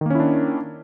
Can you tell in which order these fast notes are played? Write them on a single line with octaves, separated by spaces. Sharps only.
D#3 A#3 C#4 E4 D4